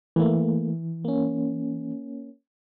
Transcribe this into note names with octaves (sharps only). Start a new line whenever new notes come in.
E3 A3 A#3
A#3 C#4